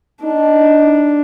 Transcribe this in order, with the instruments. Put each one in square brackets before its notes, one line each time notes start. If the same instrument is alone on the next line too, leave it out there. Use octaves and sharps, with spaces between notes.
[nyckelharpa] D4 [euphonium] D#4